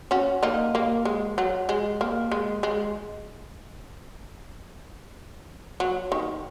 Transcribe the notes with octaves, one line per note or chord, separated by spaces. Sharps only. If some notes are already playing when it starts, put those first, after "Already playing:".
C#4 F#4
A#3 D#4
A#3
G#3
F#3
G#3
A#3
G#3
G#3
F#3
D#3